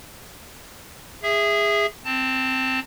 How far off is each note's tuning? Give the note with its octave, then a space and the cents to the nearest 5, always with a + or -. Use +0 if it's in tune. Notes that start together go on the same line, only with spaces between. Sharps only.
G#4 -15 E5 +0
C4 +0 A5 +15